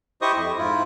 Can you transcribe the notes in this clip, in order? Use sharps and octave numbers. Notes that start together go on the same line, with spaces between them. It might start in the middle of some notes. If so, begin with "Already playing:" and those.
E4 G4 C5 D#5 C#6 D#6
F2
G#2 E4 F4